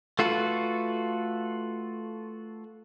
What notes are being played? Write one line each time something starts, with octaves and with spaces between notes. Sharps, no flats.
A3 F4 F#4 A4 B4